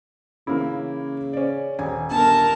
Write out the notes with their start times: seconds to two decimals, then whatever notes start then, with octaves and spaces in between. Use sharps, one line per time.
0.47 C#3 E3 A#3 E4
1.33 C#4 D5
1.79 D#1 G#5
2.10 G1 A#4 A5